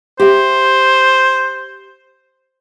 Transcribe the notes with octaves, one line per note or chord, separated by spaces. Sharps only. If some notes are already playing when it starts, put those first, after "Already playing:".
G4 C5 E5